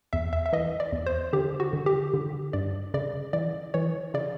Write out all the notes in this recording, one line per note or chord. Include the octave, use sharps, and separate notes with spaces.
E2 E5
E5
E5
E3 D#5
D5
E2
C5
D3 G4
F#4
D3
G4
D3
G2 D5
C#3 D5
E3 D5
E3 C#5
C#3 D5